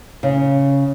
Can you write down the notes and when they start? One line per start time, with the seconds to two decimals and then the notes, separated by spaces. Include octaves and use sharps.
0.23 C#3